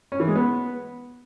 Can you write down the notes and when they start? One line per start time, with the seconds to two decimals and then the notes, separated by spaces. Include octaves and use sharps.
0.12 C#4
0.20 E3
0.28 G#3
0.36 B3